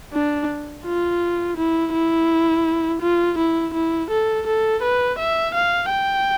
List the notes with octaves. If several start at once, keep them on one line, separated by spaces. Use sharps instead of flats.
D4
F4
E4
E4
F4
E4
E4
A4
A4
B4
E5
F5
G5